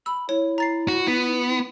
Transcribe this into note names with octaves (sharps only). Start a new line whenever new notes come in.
B5 E6
E4 C#5
A#5 A6 C7
F#4
B3